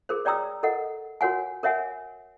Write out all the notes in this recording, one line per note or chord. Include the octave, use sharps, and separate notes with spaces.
G#4 A#4 C5
C#5 D5 G5 A#5 D#6 E6
A4 A#4 D#5 F#5
F#4 A#4 C#5 F#5 G#5
A#4 C#5 E5 F#5 G#5